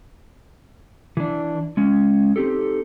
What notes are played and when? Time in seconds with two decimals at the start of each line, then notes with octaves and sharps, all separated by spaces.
1.17 E3 D4
1.77 G#3 C#4
2.36 C4 D#4 G4 A4